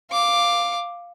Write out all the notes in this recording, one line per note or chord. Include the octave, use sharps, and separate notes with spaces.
F5 D6